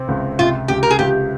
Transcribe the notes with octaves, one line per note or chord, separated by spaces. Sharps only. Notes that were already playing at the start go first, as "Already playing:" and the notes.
Already playing: C3 C4
C#2
C3 F4
C#2 G4
A#4
G#4
C#2 G4